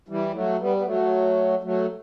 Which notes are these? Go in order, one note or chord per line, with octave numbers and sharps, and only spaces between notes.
E3 G3
F#3 A3
G3 B3
B3
F#3 A3
F#3 A3